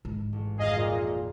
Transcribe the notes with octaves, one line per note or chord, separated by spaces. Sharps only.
G#2
A1
G#1 F2 G#4 D#5 F5
A#2